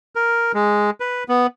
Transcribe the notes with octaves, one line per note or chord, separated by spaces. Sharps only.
A#4
G#3
B4
B3